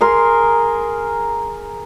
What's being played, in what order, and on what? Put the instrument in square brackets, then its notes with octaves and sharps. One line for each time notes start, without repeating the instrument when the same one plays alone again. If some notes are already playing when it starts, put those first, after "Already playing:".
[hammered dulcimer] G#4 A#4 C6